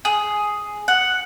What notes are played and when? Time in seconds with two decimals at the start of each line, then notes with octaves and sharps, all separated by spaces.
0.05 G#4
0.88 F#5